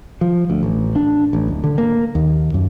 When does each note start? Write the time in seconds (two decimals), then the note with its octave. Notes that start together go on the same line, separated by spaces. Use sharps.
0.21 F3
0.50 D2
0.63 A1
0.96 D4
1.33 A1
1.48 D1
1.64 D3
1.78 A#3
2.15 D#2
2.54 F#2